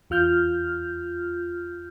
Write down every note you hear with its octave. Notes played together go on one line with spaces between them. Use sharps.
E2 F4 F6 G6